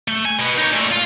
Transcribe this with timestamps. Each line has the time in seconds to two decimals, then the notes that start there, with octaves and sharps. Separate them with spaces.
0.08 A3
0.25 G#5
0.39 B2 B3
0.58 D#4 C#5
0.72 A#2 A3
0.91 F4